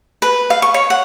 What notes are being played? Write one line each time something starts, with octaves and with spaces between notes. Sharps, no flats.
B4
F5
C#6
C#5
F#5